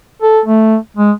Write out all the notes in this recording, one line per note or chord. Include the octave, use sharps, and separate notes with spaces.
A4
A3
G#3